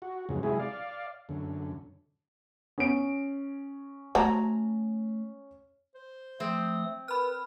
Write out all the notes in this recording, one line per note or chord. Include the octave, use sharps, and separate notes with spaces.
F#4
F2 G#2 C#3 F#3
C3 F#3 G#3 E4 G#4
D5 F5
F#2 D3
B3 C#4 D7
F#3 A3 C5 A5 A#5
C5
F3 A3 C4 D#6
A#4 B4 B5 F6